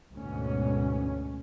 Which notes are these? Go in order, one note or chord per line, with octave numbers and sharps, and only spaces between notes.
D2 G#2 B2 C#4